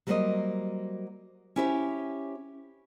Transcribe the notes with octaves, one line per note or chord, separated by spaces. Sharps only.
F#3 G3 A#3 A#4 C5 D#5
C#4 E4 G4 C5 D5 E5